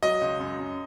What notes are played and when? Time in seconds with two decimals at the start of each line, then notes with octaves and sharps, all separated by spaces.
0.02 F#3 D#5
0.21 C#2
0.40 F#2
0.59 F#2